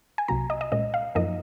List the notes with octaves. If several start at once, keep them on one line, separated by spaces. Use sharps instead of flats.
G#5
C2 C3 F#3 A#3 A#5
D#5
D#5
A#2 G#3 C#4 D#5
F5
F#2 F3 A#3 D#4 D#5